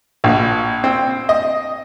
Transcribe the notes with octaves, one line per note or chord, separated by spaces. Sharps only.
A#1
C4
D#5